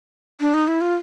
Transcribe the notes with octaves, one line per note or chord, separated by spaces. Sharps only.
D4
D#4
E4
F4